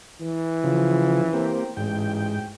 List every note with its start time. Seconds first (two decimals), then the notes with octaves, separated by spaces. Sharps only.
0.21 E3
0.64 C#3 F3
1.33 A#3 C4 G4
1.77 A1 G#2 G5